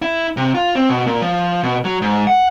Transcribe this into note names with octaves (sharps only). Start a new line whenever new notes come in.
E4
C3
F4
C4
B2
A#2
F3
B2
F#3
G#2
F#5